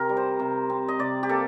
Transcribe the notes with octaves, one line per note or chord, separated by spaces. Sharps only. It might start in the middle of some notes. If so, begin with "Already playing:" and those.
Already playing: C3 C4 A#4
G3
C5
C3
C4
D#5
C3 D5
G4
A#3 A4